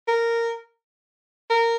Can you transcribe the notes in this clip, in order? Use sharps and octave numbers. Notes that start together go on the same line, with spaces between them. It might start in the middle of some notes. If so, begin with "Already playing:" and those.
A#4
A#4